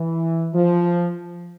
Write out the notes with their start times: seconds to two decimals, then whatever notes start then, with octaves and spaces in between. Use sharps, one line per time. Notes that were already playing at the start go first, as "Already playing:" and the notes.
Already playing: E3
0.54 F3